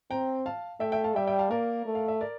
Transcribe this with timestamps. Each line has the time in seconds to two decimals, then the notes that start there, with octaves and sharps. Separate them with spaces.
0.11 C4 G5 A#5
0.46 F5 A5
0.80 A3 E5 G5
0.92 E5 G5
1.04 F5 A5
1.15 G3 E5 G5
1.27 E5 G5
1.39 F5 A5
1.51 A#3 A#4 D5
1.86 A3
1.95 F5
2.08 E5
2.21 A#4 D5